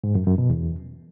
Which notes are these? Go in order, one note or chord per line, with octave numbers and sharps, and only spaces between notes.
G#2
F#2
F#2
B2
E2